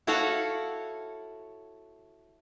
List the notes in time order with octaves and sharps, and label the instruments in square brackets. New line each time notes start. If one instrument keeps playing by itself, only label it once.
[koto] E4 F#4 A4 C#5 F5 F#5